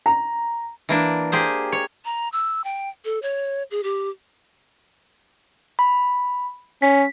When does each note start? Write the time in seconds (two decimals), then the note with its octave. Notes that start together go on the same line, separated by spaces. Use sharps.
0.06 A#5
0.89 E3 A#3 D4
1.32 A#3 G4 G#4 C5
1.72 C#5
2.05 A#5
2.33 E6
2.64 G5
3.05 A4
3.22 C#5
3.71 G#4
3.83 G4
5.79 B5
6.82 C#4 B6